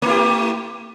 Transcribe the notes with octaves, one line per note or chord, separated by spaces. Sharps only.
A3 E4 G4